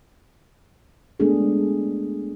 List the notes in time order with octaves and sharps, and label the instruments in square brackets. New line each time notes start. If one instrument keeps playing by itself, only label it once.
[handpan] G#3 A3 B3 D4 G#4 A4